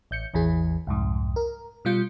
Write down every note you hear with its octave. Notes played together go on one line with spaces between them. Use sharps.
A1 G6 C#7
A1 E2 E3 G#4
C2 F2 G#2
A#4
B2 G3 F4 G6 C#7